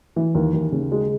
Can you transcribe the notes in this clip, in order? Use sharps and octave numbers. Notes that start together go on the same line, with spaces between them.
E3
D#2
D#2
C#3
G#3